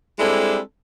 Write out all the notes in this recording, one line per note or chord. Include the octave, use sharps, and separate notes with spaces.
G3 G#3 C4 D4 E4 A4